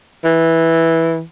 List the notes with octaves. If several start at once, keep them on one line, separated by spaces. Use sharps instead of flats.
E3